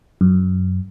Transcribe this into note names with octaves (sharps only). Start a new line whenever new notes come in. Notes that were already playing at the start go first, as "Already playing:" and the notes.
F#2